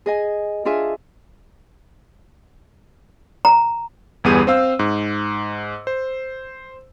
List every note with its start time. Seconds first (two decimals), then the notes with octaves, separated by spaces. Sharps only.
0.06 G#4 D#5 G#5
0.65 D4 F4 G#4 E5 G#5
3.45 A#5
4.24 G1 E2 G3 B3 G#4 D#7
4.47 C4 C5 F5 E6
4.79 G#2
5.87 C5